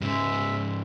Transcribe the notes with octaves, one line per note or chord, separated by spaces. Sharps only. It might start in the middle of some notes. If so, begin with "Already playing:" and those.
G#2 C#3 G#3 E5